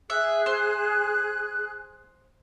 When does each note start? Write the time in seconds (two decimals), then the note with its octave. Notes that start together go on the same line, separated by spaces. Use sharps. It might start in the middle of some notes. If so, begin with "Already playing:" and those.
0.10 G#4 E5 F#6
0.46 C5